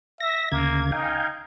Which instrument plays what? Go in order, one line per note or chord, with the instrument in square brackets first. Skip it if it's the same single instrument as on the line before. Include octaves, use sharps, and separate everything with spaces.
[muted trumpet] E5 [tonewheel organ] A#6
[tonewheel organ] D2 C#3 G#6 [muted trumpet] A#3
[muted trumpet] D#4 [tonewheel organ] F5 G5 G#5